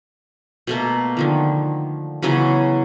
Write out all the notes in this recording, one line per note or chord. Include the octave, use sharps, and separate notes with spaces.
B2 A3 A#3
D3 D#3 F3
C#3 E3 F#3 B3